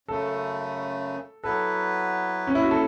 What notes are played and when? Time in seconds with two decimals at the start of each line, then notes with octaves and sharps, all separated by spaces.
0.08 F#2 C#3 A3 A4
1.44 F#3 B3 E4 A4 B4
2.47 C#4
2.55 E4
2.63 F#4
2.71 A4